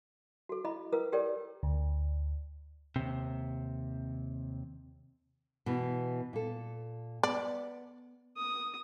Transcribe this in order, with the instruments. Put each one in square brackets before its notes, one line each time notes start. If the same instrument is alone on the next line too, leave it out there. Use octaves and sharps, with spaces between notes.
[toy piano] F#4 A4
E4 D#5 B5
E4 A#4 B4 D#6
G4 A4 A#4 C#5 D5 G5
[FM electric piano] D2
[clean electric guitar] D#2 C3
[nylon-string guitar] B2 E3
A#2 A4
[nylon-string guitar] B3 [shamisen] D5
[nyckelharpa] D#6